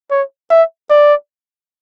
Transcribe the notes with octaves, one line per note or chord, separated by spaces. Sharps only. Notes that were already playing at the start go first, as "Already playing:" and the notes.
C#5
E5
D5